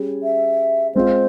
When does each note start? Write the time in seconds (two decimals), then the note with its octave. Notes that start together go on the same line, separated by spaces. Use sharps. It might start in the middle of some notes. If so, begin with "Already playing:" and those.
Already playing: G3 C#4 G#4
0.23 E5
0.95 G#3 C4 F4 C5